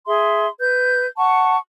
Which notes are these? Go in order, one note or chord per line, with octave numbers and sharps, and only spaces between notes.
G#4 E5 C6
B4 G6
F#5 A5 C#6